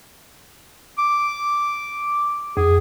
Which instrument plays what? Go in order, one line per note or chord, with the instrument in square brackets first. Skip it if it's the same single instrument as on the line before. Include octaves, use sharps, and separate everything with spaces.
[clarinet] D6
[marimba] F2 [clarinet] G#4